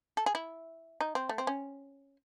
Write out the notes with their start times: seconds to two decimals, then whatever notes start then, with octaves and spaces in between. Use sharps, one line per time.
0.17 A4
0.26 G#4
0.35 E4
1.01 D#4
1.15 C4
1.29 A3
1.38 C4
1.47 C#4